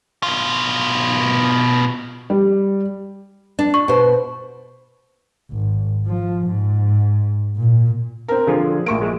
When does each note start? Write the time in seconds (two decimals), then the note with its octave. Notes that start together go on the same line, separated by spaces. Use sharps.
0.23 B2 F4
2.30 G3
3.59 D4
3.74 C#6
3.88 B2 C5
5.51 G#1
6.06 F3
6.46 G#2
7.57 A#2
8.28 C4 A#4
8.47 D3 F3 F4 G#4
8.86 A#1 A#3 E5 C#6 D7
9.01 G#3 G#4 E5